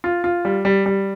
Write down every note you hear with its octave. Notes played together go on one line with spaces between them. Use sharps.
F4
F4
G3
G3
G3